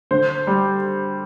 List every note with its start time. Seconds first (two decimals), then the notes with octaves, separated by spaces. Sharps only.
0.11 D3 C5
0.47 G3